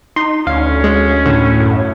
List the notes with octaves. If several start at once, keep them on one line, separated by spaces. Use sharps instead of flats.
D#4 C6
D2 C#4 F5
G#3
A2 D3
F#2